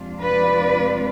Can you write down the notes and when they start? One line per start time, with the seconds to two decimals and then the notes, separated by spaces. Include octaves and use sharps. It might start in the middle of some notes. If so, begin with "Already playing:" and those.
Already playing: F2 C3 G#3 D4 F4
0.22 B4 D5